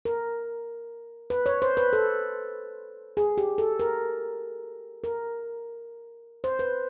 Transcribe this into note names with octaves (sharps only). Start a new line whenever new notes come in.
A#4
B4
C#5
C5
B4
A4
G#4
G4
A4
A#4
A#4
C5
B4